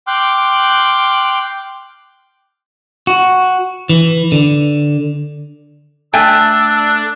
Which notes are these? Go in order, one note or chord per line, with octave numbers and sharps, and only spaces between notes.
G5 C6 D6 F6 F#6
F#4
E3
D3
A3 D4 G5 G#5 E6